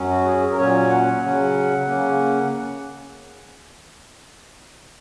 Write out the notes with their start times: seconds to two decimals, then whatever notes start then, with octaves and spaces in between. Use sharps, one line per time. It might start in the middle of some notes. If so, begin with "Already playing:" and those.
Already playing: F#2 F#3 C#4
0.09 F#4
0.25 G#4
0.52 A#4
0.57 A#2 F#3 C#4 C#5
0.90 F#5
1.23 C#3 F#3 C#4
1.86 C#3 A#3 C#4